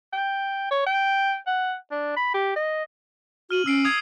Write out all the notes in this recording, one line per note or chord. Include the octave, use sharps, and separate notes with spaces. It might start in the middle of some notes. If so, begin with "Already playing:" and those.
G5
C#5
G5
F#5
D4
B5
G4
D#5
F#4 F6 D#7 F#7
C#4 E6 C7 D7
D#6 G#6 C7